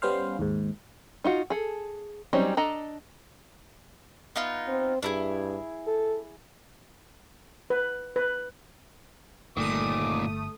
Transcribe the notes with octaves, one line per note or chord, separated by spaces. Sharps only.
G3 B3 C#4 C5 F5
D#2 G#2
D#4 F4 F#4
G#4 A4
F#3 G3 C4 C#4 D#4
D4 A4 D#5 A#5
B3 D#4 F4
C4
G2 D4 E4 G#4
A4
B4
B4
G1 A#2 D#3 A3 D6 D#6